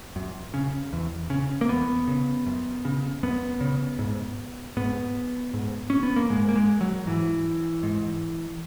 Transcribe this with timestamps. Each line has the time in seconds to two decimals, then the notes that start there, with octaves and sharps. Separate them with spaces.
0.16 F#2
0.54 C#3
0.93 E2
1.30 C#3
1.61 A#3
1.69 E2 B3
2.08 C#3
2.46 F#2
2.85 C#3
3.23 F#2 B3
3.61 C#3
3.99 G#2
4.77 G#2 B3
5.54 G#2
5.90 C#4
6.03 B3
6.16 A#3
6.30 G#2 G#3
6.49 A#3
6.56 G#3
6.81 F#3
7.06 G#2 E3
7.83 G#2